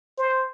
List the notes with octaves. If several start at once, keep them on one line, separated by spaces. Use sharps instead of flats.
C5